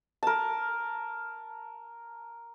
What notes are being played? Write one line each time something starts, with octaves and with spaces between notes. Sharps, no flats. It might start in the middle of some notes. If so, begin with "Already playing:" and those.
A#4 A5